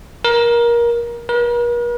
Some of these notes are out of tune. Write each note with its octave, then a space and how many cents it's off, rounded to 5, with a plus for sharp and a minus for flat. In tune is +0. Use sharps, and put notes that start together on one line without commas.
A#4 +20
A#4 +45